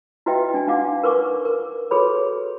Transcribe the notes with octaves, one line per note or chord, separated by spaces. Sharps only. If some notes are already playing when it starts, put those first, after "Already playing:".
E4 F#4 B4 D#5 E5 G5
D4 G#5
D4 D#4 F5 F#5 D6
A#4 B4 C#6 D6
A#4
F#4 G#4 A4 B4 C#5 B5